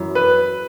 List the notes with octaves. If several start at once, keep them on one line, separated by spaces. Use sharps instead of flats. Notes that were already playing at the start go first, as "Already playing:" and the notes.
Already playing: F#2 E3
B4